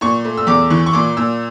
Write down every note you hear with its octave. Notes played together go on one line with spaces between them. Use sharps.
A#2 C#6
A3
E6
E2 D6
E3 C#6
C#6
A#2 D6
A#2 E6